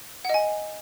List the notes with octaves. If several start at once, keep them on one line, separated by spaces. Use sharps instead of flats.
D#5 F#5 G#5